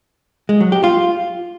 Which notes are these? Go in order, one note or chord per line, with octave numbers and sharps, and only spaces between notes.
G#3
F#3
G4
F4